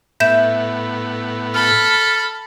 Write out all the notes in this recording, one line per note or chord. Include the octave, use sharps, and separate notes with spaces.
A2 B3 E5 G6 E7
A4 B5 F6